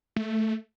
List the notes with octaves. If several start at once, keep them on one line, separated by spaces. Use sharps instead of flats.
A3